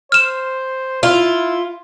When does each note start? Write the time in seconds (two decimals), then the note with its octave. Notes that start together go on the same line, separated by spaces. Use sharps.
0.12 C5 F6 E7
1.03 E4 F4